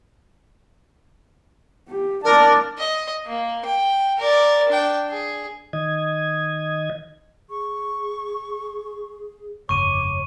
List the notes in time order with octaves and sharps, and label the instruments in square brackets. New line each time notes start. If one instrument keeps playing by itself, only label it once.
[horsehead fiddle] G4
[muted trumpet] D4 [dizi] A#4 [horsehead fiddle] D5 A5
[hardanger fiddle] D#5
A#3
G5
A#4 D5
D4 G5
G#4
[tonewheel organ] D#3 D#5 G#6
[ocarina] G#4 [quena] C#6
[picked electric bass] G1 F2 C#3 [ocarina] C#5 [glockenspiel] C#6 D#7 [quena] D6